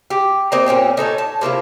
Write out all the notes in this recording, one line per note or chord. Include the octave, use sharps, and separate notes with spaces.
G4
A#3 C4 D#4 D#5
A#2 C4 C#4 G4
D#4 A4 C5 C#5
A5
C3 A#3 E4 F4